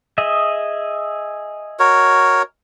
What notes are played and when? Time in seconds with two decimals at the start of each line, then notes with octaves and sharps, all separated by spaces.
0.18 G#4 D#5 E5
1.79 F#4 A#4 C#5